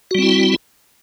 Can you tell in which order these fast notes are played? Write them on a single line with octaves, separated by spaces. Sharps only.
F#4 G3 C4 E4